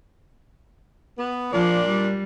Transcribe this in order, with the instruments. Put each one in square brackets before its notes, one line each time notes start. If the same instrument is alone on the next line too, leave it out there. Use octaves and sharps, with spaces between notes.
[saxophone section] B3
[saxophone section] A#2 D4 D5 [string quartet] F3
[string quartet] G3